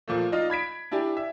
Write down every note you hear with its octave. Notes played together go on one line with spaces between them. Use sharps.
A#2 F3 A3
D#4 F4 D5 D#5 F5
B5 G#6 B6 D7
D4 E4 G4 G#5
E5